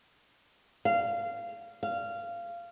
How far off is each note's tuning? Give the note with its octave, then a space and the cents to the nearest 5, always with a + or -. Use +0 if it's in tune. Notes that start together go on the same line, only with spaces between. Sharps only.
F5 -20
F5 -20